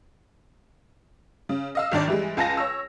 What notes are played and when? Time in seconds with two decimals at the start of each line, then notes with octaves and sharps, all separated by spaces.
1.49 C#3
1.75 D#5 F5 E6
1.92 G#1 D#3 D4 D5
2.08 E3 G3 G#3
2.37 C#2 F4 G#5 A5 A#6
2.57 C#5 E6